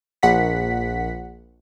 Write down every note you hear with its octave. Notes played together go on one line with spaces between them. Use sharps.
A#1 F#5 B6